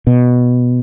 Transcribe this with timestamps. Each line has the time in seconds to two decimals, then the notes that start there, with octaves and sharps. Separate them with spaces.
0.07 B2